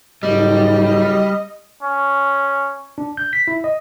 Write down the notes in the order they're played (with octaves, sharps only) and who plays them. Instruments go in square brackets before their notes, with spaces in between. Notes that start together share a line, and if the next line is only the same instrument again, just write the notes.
[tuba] F#1 [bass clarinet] G#2 [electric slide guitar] G3 [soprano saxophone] D#5
[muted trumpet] C#4
[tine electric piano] D4
G6
B6
E4
D#5